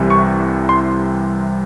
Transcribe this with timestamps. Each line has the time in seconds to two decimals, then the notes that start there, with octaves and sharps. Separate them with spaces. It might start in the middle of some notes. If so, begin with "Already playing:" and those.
Already playing: C2 C3 E3 G3
0.10 C#6
0.69 C6